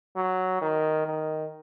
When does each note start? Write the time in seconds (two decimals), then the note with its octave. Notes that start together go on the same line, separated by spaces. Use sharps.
0.16 F#3
0.62 D#3
1.06 D#3